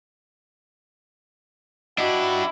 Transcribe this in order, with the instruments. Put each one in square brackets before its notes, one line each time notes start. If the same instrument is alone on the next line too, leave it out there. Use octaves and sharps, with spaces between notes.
[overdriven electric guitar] D4 G4 [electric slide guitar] E4 [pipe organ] F#4 [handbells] D#5